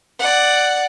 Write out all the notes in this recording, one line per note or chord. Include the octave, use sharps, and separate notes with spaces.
D5 F#5